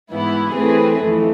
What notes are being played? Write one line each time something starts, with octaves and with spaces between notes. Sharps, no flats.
G#2 E3 B3 E4
E3 A3 C4 G#4 B4
F2 E3 A3